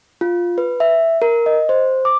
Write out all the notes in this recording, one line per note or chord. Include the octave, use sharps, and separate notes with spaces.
F4
B4
E5
A#4
D#5
C5
D6